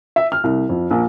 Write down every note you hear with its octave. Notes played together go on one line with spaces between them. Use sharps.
E5
F6
C2
F2
A#1